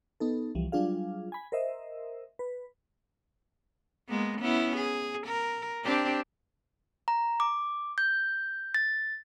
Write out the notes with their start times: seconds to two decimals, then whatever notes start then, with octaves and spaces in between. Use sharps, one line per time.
0.20 B3 D#4 A4
0.55 C2 E3 F3 G3
0.72 F#3 G3 D4 F4 G#4 F5
1.32 G#5 B5
1.52 A#4 C5 D#5 E5
2.39 B4
4.09 G#3 A#3 B3
4.41 B3 C#4 E4
4.77 G#4
5.27 A#4
5.84 C4 D4 G4
7.08 A#5
7.40 D6
7.98 G6
8.74 A6